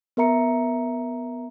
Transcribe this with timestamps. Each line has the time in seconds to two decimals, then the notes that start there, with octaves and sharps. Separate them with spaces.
0.17 B3 A#4 E5 A#5 C#7